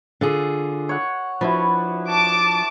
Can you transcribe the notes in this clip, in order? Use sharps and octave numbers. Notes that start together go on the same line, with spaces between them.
D3 F4 G#4
C#5 F#5
F3 D4 E4 F#4 B4
A5 D6